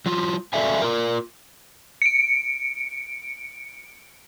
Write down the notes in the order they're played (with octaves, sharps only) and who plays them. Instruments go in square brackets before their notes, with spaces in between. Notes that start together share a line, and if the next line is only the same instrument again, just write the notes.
[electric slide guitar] F#3 F4
F#4 A4 D5 E5 F5 G#5
F4 A#4
[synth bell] C#7 D7